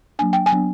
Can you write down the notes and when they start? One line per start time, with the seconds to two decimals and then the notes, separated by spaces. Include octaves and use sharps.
0.19 F#3 A#3 D4 G#5
0.33 G5
0.46 G#5
0.52 F#3 B3 D4